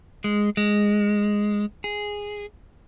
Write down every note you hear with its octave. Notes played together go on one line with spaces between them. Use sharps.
G#3
G#3
G#4